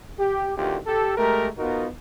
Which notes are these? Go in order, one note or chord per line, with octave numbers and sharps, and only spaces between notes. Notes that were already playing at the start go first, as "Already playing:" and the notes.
G4
A1 D2 D#3 F4 G4
G4 A4
G#3 A3 G4 A#4
B3 D#4 F4 F#4 A#4